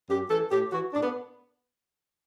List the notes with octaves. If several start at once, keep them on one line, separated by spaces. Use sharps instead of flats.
F#2 G4
E3 A4
A2 G4
E3 F#4
A2 D4
B3